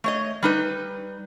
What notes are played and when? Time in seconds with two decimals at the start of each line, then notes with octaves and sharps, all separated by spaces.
0.04 A3 C#5 D#5
0.43 G3 D#4 B4